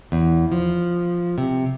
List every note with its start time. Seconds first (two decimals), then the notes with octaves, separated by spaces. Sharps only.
0.12 E2
0.52 F3
1.38 C3